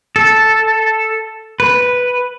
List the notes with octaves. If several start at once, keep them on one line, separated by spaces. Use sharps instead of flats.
A4
B4